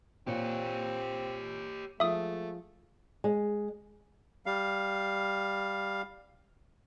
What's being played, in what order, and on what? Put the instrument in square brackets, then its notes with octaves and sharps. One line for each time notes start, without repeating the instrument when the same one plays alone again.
[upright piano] A#2 [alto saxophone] C4 [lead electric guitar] G4 C#5
[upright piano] F3 G#3 [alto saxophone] A3 [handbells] E5 D#6
[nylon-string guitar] G#3
[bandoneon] G3 F5